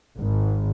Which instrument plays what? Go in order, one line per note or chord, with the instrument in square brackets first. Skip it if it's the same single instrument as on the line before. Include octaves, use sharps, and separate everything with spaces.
[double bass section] G#1